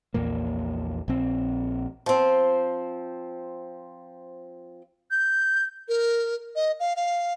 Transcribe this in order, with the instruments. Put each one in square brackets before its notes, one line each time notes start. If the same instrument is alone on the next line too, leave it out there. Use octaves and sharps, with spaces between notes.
[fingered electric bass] A#1 E2 A#2 A#3
A#1 C4
[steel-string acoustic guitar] F3 C4
[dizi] G6
A#4
D#5
F5
F5